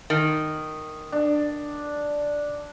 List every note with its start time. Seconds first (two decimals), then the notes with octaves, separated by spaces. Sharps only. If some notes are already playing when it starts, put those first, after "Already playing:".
0.10 D#3
1.12 D4